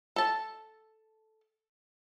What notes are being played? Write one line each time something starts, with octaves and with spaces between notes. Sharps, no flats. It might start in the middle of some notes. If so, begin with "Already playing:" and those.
A4 A5